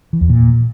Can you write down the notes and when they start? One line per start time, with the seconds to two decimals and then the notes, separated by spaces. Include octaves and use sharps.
0.13 E3
0.21 E2
0.29 A#2